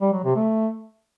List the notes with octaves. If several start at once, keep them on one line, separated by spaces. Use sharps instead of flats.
G3
F#3
C3
A3